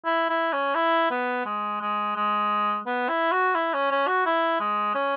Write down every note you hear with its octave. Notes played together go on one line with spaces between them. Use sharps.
E4
E4
C#4
E4
B3
G#3
G#3
G#3
B3
E4
F#4
E4
C#4
C#4
F#4
E4
G#3
C#4